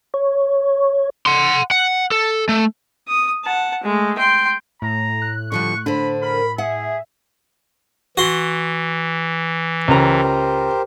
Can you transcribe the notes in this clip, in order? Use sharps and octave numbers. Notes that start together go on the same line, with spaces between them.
C#5
F#5 C6
F#5
A4
A3
D#6
F#5 A5
G#3 A3
G5 C6
A2 A#5
F#6
D3 F3 G3 C#6
D3 D4 C5 B5
A#4 B5
G#4 E5 F#5
E3 F#4 C6
C#2 G4 A#4 C5 A#5